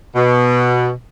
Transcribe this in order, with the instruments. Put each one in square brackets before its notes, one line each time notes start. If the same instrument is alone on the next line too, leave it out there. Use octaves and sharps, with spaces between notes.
[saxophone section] B2